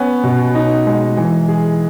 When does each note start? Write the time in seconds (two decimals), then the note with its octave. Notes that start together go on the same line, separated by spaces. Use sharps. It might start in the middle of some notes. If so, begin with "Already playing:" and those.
Already playing: B3 C#4
0.23 B2
0.55 D#4
0.87 G#3
1.17 E3
1.48 G#4